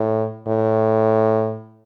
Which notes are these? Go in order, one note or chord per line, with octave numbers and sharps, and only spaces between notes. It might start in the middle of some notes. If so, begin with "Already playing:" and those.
Already playing: A2
A2